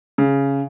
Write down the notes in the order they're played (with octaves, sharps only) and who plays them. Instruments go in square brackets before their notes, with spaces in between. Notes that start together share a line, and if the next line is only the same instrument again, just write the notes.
[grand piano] C#3